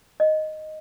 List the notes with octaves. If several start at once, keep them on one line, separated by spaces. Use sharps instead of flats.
D#5